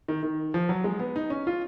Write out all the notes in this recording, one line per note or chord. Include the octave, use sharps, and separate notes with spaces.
D#3
D#3
F3
F#3
G#3
B3
D#4
C#4
F4